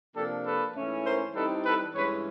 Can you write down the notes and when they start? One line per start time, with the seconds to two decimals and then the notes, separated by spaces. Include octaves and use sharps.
0.15 C3 F3 A#3 D4 G4 A4
0.45 A4 B4
0.75 G#2 E3 A3 C#4
1.05 A#4 C5
1.35 E3 G3 C4 D#4 A4 B4
1.65 A4 B4
1.94 G2 E3 G#3 C#4 B4 C#5